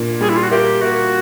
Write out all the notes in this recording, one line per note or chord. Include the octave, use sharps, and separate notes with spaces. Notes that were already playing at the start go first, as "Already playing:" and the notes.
Already playing: A#2 A#3 D4
G3 G#4
E4
F4
F#4
A#3 G4
A#3 F#4